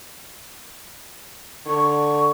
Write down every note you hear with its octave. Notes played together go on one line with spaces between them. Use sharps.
D3 C#6